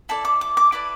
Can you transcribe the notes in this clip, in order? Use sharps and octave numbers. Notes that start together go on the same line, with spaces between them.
E4 A4 D5 A5
D6
D6
D6
E4 B4 D5 D6